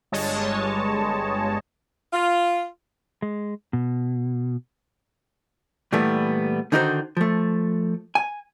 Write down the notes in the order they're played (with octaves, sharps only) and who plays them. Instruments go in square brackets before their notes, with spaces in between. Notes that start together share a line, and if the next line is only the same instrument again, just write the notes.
[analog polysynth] G1 G2 G#3 C#5 D#5 A5
[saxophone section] F4
[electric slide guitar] G#3
B2
[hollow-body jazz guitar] A#2 E3 G3 A3 B3
D3 D#3 D#4 F#4 A#4 C5
F3 A3
G#5